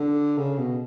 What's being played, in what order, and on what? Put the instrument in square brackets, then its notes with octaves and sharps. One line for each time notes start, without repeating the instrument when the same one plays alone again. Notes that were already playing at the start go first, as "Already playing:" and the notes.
Already playing: [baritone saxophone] D3
C#3
B2